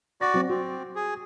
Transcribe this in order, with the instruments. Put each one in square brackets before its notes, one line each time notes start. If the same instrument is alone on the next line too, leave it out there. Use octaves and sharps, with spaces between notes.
[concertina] F#4 D5 [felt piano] A#6
[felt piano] F#3 C4
[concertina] C4 [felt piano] F#4
[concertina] G#4